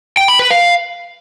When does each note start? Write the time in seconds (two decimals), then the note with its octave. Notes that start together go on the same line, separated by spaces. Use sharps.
0.17 G5
0.28 B5
0.39 B4
0.51 F5